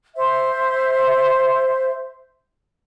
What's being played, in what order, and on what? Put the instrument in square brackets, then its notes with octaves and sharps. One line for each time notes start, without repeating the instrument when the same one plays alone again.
[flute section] C5 E5